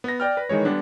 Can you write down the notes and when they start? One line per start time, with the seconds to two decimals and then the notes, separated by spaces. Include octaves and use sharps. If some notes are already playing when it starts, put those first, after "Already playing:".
0.04 B3 A#6
0.20 D5 G5 F6
0.37 B4
0.49 D#3 E3 G#3 C#5
0.65 D3 G3 B3 D4